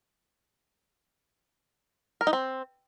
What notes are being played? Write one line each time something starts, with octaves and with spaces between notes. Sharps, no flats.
A#4
D#4
C4